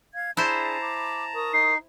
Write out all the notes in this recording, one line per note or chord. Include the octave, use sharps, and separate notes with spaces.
F5 G#6
D4 E4 G#4 C5 A5 A#5
B5 D6
A#4 C#6 D#6
D#4 C7